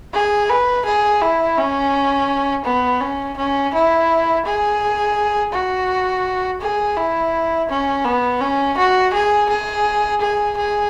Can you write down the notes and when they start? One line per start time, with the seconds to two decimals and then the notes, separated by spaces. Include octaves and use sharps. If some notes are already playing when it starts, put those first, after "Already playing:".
0.13 G#4
0.49 B4
0.86 G#4
1.22 E4
1.57 C#4
2.65 B3
3.01 C#4
3.37 C#4
3.74 E4
4.45 G#4
5.53 F#4
6.61 G#4
6.97 E4
7.69 C#4
8.05 B3
8.41 C#4
8.77 F#4
9.13 G#4
9.49 G#4
10.21 G#4
10.57 G#4